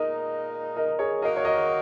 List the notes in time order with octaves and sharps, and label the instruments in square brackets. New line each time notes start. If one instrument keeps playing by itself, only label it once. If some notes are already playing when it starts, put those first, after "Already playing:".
Already playing: [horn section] A#2 G#3 D#4 [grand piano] A#4 D#5
[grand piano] A#4 D#5
G#4 C#5
[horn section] D#3 A#3 D#4 F#4 [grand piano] A#4 D#5
[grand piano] C#5
A#4 D#5